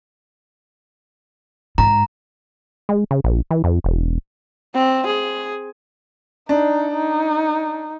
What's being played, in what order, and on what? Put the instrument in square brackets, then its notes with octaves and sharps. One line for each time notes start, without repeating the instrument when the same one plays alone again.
[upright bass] G#2 [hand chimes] A#5
[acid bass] G#3
C#3
A#1
E3
F2
E1
[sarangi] C4
G#4
[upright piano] D4 [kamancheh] D#4
[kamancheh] D#4